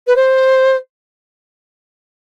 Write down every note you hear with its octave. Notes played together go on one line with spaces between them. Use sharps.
B4
C5